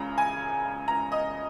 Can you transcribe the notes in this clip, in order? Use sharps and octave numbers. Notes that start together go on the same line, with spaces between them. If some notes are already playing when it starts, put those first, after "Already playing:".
Already playing: C#2 C#3 A#5
G#5
A#5
D#5